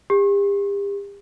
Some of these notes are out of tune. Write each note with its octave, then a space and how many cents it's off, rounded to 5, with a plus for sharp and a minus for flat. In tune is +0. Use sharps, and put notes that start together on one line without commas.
G4 +40